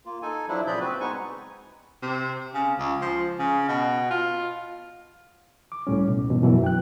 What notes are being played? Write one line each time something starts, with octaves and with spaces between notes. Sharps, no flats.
A#3 F4
D#4 A4 G#5
F3 F#3 D4 E4
A#2 C#3 G#4 D5 B5 G6
C4 F#4 B4
G#3 B3 D#4 G#5 C#6
C3
C#3
C#2
F3
C#3
B2
F4
D6
C#2 A2 G3 C#4
B2
E2 G2 B2 E3
F#2 B2 E3 F#3
G5 F#6